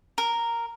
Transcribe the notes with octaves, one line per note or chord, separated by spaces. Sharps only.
A#4